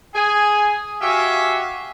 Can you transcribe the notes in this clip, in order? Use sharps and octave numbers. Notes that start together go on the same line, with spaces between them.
G#4 G#5
F#4 G4 E5 F5 G#5